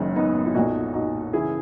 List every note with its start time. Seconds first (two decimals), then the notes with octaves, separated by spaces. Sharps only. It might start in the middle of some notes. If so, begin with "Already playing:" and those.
Already playing: F#1 F#2 D#3 G#3
0.16 B3 D#4
0.46 E4
0.55 B1 A#2 D#4 F#4
0.94 D#4 F#4
1.33 C#3 E3 E4 G#4